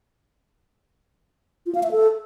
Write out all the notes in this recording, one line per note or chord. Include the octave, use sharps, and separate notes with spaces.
F4
F5
E5
A4